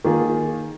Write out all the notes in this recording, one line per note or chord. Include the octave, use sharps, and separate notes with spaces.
D#3 A#3 F4 G#4